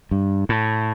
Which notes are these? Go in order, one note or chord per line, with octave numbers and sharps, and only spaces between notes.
G2
A2